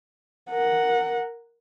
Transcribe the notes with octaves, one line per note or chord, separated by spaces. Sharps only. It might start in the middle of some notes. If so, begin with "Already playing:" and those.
A#4 F#5